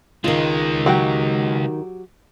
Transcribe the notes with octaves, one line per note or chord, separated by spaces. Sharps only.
C#2 D#3 G#3 F4
F#3 F#4 G4